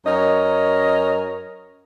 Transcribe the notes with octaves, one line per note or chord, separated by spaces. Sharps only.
F#2 A#4 C#5 D#5